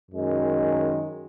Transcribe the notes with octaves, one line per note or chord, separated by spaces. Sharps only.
F#2 D#3 G#3